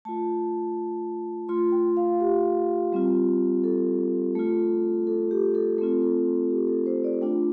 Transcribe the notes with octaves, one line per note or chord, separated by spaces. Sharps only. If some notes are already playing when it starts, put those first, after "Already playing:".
A3 F4 A5
A3 F4 C6
G5
F5
G4
G3 C4 F4
A4
A3 F4
A4
G4
A4
A3 C4 F4 A4
A4
G4
A4
C5
D5
A3 D4 F4 G5